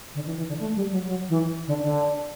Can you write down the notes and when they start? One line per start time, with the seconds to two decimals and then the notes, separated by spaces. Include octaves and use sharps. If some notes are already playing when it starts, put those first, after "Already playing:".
0.15 D3
0.26 E3
0.37 E3
0.48 D3
0.59 A3
0.75 G3
0.90 F#3
1.06 F#3
1.29 E3
1.67 D3
1.82 D3